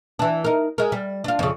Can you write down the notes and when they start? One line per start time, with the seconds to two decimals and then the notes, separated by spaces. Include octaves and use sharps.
0.19 E3 D4
0.44 D#4 A#4
0.78 G#3 A#4
0.92 G3
1.24 D4 F4
1.39 F2 C#3